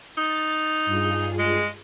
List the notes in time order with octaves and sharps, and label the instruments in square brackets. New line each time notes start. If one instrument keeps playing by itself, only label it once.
[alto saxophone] D#4 [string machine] A6
[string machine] G2 F4 G#4
[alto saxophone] G#3